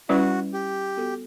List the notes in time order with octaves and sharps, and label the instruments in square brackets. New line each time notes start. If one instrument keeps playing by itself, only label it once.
[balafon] G3 C#4 E4 B4 D5 [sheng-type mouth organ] F#4
[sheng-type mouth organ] G4
[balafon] B3 F#4 A4